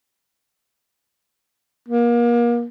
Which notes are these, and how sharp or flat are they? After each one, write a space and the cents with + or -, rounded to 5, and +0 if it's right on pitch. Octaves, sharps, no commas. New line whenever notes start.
A#3 +30